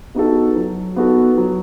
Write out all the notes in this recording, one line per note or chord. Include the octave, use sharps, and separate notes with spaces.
B3 D#4 F#4 A4
F#3
B3 D#4 F#4 A4
F#3